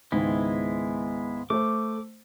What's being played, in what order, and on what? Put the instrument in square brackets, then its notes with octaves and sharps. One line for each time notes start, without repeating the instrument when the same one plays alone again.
[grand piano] C#2 G#2 D#3 [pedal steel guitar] G#3 B3 E4
[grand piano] A3 C5 [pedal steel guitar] D6